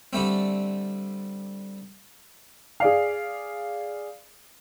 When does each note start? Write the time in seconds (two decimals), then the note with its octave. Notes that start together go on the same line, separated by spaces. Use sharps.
0.13 D3 G3 A3 C4
2.80 G#4 D5 F5